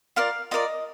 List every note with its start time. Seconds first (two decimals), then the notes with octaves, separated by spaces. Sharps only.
0.16 F4 A#4 D5 F5
0.51 F4 A#4 D5 D#5